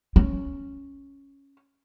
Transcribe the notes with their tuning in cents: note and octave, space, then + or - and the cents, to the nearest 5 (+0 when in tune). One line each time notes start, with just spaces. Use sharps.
C#4 +0